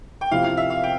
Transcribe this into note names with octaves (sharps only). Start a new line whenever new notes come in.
G5
C3 F3 C4 E4 F5
F5
E5
F5
G5